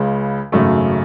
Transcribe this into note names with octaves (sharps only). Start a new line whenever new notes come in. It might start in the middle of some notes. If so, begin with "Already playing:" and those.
Already playing: C#2 C#3 G#3
G#1 F#2 C#3 F#3 A3